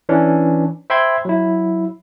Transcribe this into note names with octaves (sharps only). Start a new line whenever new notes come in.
E3 C#4 D4
C5 E5 G5 B5 C6 G#6
F#3 E4